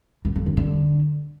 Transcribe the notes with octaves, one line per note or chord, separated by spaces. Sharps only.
F#2
F2
D3
D3